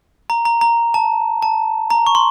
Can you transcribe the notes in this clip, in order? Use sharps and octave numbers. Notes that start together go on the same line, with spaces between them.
A#5
A#5
A#5
A5
A5
A#5
C#6
C6